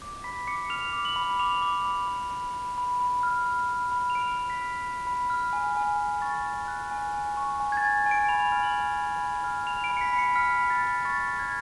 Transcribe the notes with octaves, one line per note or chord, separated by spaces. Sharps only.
D6
B5 B6
D6 C#7
F6 F7
D6
F#7
B5
D6 F7
D6
B5
D6
B5
B5
B5
B5
F6
B5
B5
B5
F7
F6 D7
F6
B6
F6
B5
B5
F6
G#5
G#5
G#5
C#6 A6
G#5
F#6
G#5
G#5
C#6
G#5
G#6
A6
G#5
G#5
D7
B5 F7
F6
F#7
B5
B5
B5
F6
B5 F7
D7
B5
C#7
B6
B5
C#7
F6 B6
B5
A6
B5
C#6 A6
F6
G#6